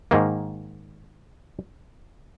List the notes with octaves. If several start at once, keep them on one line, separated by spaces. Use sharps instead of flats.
G#2 D#3 A#3